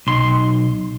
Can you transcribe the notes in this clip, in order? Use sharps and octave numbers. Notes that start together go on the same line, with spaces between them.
B1 C6